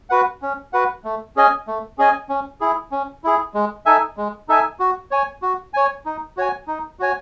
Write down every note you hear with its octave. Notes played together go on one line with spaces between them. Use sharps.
F#4 B4 F#5
C#4
F#4 B4 F#5
A3
C#4 G#4 D#5 G#5
A3
C#4 G#4 D#5 G#5
C#4
E4 G#4
C#4
E4 G#4
G#3
D#4 A4 E5 G#5
G#3
D#4 A4 E5 G#5
F#4
C#5 G#5
F#4
C#5 G#5
D#4
F#4 C#5 G#5
D#4
F#4 C#5 G#5